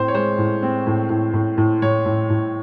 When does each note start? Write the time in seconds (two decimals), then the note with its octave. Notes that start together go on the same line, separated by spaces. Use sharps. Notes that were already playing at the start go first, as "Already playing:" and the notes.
Already playing: A2 C4 C5
0.08 C#5
0.15 G#3 C5
0.38 A2
0.63 C4
0.87 A2
1.09 A2
1.33 A2
1.57 A2
1.82 A2 C#5
2.06 A2
2.30 A2